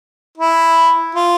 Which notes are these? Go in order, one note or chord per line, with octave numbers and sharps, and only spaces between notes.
E4
F4